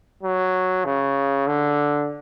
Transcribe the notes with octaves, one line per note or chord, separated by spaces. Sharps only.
F#3
C#3
D3